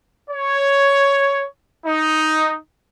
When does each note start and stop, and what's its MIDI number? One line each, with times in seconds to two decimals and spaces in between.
0.30 1.46 73
1.86 2.57 63